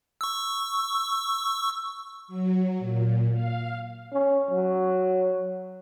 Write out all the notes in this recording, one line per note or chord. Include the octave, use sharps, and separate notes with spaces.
C#6 E6
F#3
A#2
F5
C#4
F#3